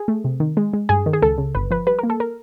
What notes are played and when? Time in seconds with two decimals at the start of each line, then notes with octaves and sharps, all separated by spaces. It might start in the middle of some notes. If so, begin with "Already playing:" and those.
Already playing: G#4
0.08 A3
0.24 C3
0.40 D#3
0.57 G#3
0.73 G#3
0.89 G2 G#4
1.06 D#3
1.13 G#4
1.22 C#2 A4
1.38 C#3
1.55 G1 B4
1.71 F3 B4
1.87 G3 B4
1.99 A#3 A#4
2.10 A4
2.20 A#4